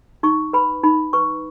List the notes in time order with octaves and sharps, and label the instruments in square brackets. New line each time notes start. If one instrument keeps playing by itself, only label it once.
[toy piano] D#4 C#6
B4 B5
D#4 B5
B4 C#6